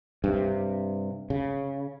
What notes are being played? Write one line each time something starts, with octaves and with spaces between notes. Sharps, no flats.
G2 C3
C#3